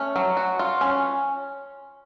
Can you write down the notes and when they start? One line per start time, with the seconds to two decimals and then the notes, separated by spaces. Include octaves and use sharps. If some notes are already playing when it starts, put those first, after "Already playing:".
Already playing: A3 C#4
0.16 F#3
0.37 F#4
0.59 F4
0.81 C#4